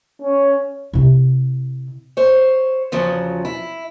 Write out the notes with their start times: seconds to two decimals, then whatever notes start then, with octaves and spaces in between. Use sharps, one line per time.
0.22 C#4
0.93 C3 E4
2.17 C5 C#5
2.92 E2 C#3 F3 F#3
3.45 E4